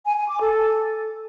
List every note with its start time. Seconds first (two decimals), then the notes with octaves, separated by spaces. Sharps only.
0.05 G#5
0.17 G#5
0.28 D6
0.40 A4